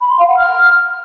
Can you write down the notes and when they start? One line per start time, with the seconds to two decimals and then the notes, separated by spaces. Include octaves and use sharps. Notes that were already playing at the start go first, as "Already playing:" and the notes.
0.01 B5
0.10 C6
0.19 F5
0.28 F#5
0.38 F6